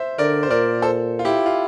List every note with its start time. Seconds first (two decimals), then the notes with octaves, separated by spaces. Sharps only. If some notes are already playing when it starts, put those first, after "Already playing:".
Already playing: C5 E5
0.18 D3 A#4 D5
0.43 C5
0.50 A#2 A#4 D5
0.82 A4 C5
1.19 F4
1.25 E4 G4
1.46 F4